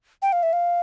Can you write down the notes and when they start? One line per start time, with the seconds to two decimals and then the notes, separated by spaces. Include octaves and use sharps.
0.22 G5
0.33 F5
0.43 E5
0.53 F5